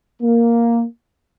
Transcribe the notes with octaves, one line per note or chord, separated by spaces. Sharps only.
A#3